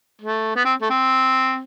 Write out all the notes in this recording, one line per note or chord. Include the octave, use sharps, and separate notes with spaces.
A3
B3
C4
A3
C4